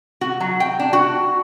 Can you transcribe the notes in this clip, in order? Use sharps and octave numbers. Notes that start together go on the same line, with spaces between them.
F#4
F#3
G5
D4
F#4